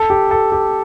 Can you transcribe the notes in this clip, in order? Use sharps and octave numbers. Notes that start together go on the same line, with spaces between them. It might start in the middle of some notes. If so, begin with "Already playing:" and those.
Already playing: A4
G4
A4
G4